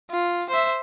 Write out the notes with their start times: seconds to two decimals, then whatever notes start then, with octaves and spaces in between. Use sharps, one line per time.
0.11 F4
0.50 C5 E5